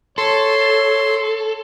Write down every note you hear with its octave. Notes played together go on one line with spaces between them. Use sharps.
A4 C#5 C6